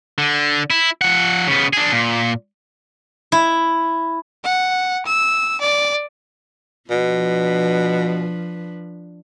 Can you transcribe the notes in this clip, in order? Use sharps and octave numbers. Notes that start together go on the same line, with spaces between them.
D3
E4
F3 F#5
C#3 B3
D4 G#4
A#2
E4
F#5
E6
D5
B2 F3 D4 B4